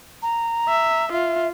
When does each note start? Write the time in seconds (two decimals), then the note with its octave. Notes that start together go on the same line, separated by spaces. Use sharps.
0.22 A#5
0.68 E5
1.12 F4 E5